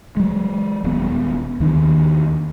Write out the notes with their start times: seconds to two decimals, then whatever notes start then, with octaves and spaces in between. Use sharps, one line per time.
0.17 F#3 G#3
0.84 D#1 B3
1.60 D#2 D#3 D4